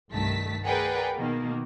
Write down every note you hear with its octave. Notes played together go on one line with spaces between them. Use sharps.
C2 G2 D#3 A3 A5 B6
G#4 A#4 B4 D5 F#5 G5
B2 D#3 A#3